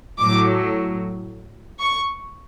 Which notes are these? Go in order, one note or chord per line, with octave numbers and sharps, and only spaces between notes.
A2 F#3 D6
C#6